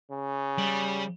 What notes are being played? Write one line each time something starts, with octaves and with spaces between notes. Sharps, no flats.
C#3
G3